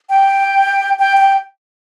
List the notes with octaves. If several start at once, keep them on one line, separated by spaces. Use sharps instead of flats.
G5
G5
G5